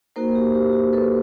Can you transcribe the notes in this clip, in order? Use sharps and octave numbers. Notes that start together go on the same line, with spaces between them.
A#3 D#4 F#4 A#4 C5
G4
G4
F#4
A4 B4